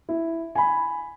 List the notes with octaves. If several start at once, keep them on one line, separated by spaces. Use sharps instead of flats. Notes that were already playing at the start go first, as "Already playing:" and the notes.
E4
G#5 B5